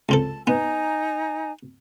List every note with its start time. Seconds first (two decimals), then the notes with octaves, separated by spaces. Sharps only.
0.09 C#2 C4 A4 A5
0.47 B3 D#4 G#5 A#5